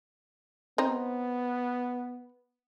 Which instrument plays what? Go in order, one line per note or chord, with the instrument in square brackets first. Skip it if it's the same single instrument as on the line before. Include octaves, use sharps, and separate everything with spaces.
[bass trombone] B3 [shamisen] C4 D#4 C5